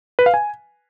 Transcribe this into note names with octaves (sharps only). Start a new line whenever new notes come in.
B4
F5
G#5